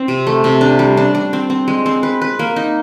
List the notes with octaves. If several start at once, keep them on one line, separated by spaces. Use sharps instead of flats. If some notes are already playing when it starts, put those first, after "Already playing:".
Already playing: C4
C3
A3
C3
D4
G3
D4
D4
C4
C4
G#3
C4
B4
B4
A#3
D#4